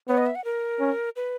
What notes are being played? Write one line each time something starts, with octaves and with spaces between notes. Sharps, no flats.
B3 C#5
D#5
E5
F#5
A#4
C#4
B4